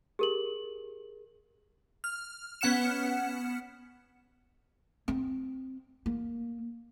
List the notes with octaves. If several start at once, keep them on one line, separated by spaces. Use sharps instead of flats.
G4 G#4 A#4 F#7
F6
B3 C#4 F#5 F6 C#7 E7
C4
A#3